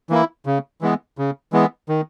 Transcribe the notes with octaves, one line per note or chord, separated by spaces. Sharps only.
E3 A#3 E4
C#3
E3 G#3 B3
C#3
E3 G#3 B3
D#3